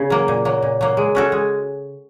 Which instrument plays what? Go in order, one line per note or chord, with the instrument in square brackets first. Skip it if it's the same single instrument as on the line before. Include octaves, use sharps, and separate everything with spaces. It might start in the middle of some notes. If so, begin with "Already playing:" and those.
Already playing: [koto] C#3
F#3 A#3
A#2
F#3 A#3
A#2
F#3 A#3
G#3
C#4 F#4 A4
G#3